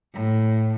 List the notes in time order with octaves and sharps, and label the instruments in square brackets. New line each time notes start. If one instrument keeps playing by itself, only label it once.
[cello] A2